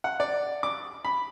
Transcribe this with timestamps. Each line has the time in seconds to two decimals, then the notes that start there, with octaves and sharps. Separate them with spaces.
0.04 F#5
0.20 D5
0.63 D6
1.05 B5